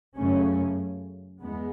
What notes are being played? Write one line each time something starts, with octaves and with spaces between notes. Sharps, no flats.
F#2 C#3 A3 C#4
E2 G#3 B3